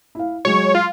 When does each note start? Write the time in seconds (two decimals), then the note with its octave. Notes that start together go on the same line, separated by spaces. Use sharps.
0.15 E4 F5
0.45 F#3 G#3 C#5
0.75 F4